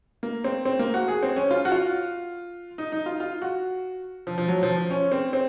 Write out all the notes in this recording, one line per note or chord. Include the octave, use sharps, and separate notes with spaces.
A#3
C4
C4
A#3
F#4
G#4
C4
C#4
F4
F#4
F4
D#4
D#4
F4
F4
F#4
F3
F3
F#3
F3
F3
C#4
C4
C4